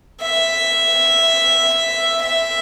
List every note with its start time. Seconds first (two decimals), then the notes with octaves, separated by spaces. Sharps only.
0.22 E5
2.22 E5